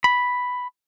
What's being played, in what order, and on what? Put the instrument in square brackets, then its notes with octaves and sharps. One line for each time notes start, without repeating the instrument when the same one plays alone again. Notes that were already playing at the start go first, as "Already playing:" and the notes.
[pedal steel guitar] B5